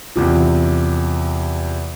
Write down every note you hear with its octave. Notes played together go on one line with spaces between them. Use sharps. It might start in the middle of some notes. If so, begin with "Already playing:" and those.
E2 C3 F3